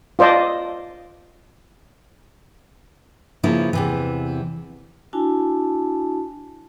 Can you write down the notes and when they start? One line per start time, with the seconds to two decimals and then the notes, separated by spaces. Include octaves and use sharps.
0.19 F4 C5 D5 D#5 A5
3.43 C#3 F3 A#3 E4
3.73 E2 C3 E3
5.13 D4 E4 F#4 G#5 A5